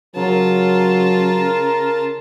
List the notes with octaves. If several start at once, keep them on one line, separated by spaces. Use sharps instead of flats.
C#3 F#3 F4 A#4 A5